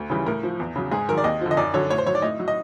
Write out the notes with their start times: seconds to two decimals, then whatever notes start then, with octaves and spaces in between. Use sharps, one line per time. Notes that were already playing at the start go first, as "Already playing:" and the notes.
Already playing: D2
0.10 C#3 E3 G3
0.26 A2 A#4
0.43 F3
0.60 E2
0.76 C#3 F#3
0.91 G#2 G#4
1.08 D#3 F#3 A#4
1.18 D5
1.24 D#2 D#5
1.41 D3 F3
1.51 D#5
1.57 F#2 D5
1.74 D3 F#3 C#5
1.90 A2 C#5
1.98 C5
2.06 F#3 C#5
2.15 D5
2.22 A2 D#5
2.39 F#3
2.48 D#5